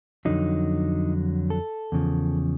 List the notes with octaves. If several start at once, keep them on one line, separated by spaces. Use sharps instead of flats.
F2 D3 F#3 D#4
A4
E2 C#3 F3